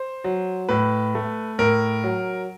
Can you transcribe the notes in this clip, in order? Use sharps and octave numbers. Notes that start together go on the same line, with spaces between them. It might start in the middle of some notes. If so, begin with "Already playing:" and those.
Already playing: C5
F#3
A2 B4
A3
A2 A#4
F#3